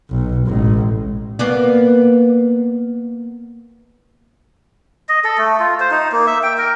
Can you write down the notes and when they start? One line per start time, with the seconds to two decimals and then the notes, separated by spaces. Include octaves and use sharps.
0.10 B1
0.46 A1 G#3
1.39 A#3 B3 D5
5.09 D#5
5.24 A4
5.38 A3
5.60 F4
5.80 C5
5.91 D#4
6.12 A#3
6.27 E5
6.43 G5
6.58 A#4